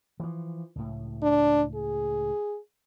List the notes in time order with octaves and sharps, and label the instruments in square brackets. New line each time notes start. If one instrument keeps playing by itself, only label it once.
[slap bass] E3 F3
C#2 A2
[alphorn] D4
G#4